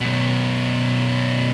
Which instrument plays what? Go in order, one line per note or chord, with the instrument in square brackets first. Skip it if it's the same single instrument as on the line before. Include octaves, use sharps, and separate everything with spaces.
[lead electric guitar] F#2 B2